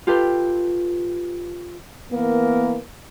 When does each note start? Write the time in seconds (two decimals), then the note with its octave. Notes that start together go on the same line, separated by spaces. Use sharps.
0.07 F4 G4 A4 B4 C6
2.12 E3 A#3 B3 A#4